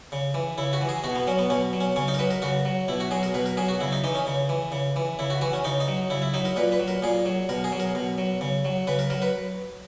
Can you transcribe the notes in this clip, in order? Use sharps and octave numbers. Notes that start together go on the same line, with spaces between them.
C#3
E3
C#3 E4
F#4
E3
G#4
B2 F#4
B3
F#3 C#4
B3
B2 C#4
F#3
C#4
C#3 C#4
D#4
A#4
F#3 B4
A#4
C#3 F#4
F#3
B2 E4
F#4
F#3 G#4
A#4
B2 B4
A#4
F#3 G#4
F#4
C#3 E4
D#4
E3 D#4
C#4
C#3
E3
C#3
E3
C#3 E4
F#4
E3 F#4
C#4
C#3 D#4
D#4
F#3
C#3 E4
E4
F#3 D#4
A#4
A#2 B4
B4
F#3
A#4
A#2 G#4
F#3
B2 A#4
G#4
F#3
A#4
B2
F#3
C#3
F#3
C#3 B4
A#4
F#3 A#4
B4